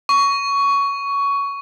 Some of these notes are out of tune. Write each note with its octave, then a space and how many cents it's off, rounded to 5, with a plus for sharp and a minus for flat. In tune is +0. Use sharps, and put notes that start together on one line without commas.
C#6 +15